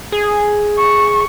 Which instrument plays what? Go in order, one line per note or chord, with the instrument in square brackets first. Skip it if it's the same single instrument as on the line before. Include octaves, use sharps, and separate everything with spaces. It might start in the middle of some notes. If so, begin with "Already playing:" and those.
[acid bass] G#4
[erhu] C#6